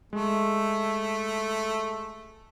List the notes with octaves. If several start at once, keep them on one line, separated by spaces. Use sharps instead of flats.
G#3 A3